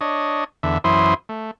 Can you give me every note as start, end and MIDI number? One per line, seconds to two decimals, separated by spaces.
0.01 0.44 62
0.01 0.44 73
0.01 0.44 75
0.63 0.78 40
0.63 0.78 50
0.63 0.78 76
0.84 1.14 42
0.84 1.14 52
0.84 1.14 64
0.84 1.14 72
0.84 1.14 84
0.84 1.14 87
1.29 1.51 57